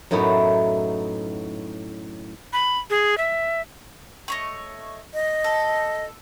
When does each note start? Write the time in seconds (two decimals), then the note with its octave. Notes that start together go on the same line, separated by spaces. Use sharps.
0.11 F#2 A2 F#3 B3 D#4 E4
2.53 B5
2.90 G#4
3.18 E5
4.28 A3 C#5 D#5
5.14 D#5
5.44 A4